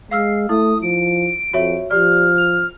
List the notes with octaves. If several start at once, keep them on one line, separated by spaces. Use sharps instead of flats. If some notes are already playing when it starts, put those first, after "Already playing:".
G#3 F5 E6 F6 C7
A3 E4 D#6
F3 D7
F2 F#4 C#5 E5
F3 G4 D5 F6
F7